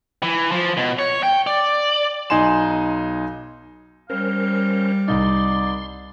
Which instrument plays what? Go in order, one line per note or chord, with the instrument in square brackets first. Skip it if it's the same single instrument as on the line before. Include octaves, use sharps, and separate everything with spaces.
[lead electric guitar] E3
F3
B2
C#5
G5
D5
[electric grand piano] B1 D#4 G#5 C6 E7
[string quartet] G3 [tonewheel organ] C#4 A#4 C5 [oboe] F5
[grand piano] C2 D#4 [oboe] D5 [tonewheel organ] C6